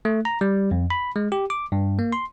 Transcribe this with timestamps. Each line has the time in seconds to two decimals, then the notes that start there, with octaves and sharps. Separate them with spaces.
0.05 A3
0.25 A#5
0.41 G3
0.71 F2
0.90 B5
1.16 G#3
1.32 G4
1.50 D6
1.72 G2
1.99 A#3
2.13 C6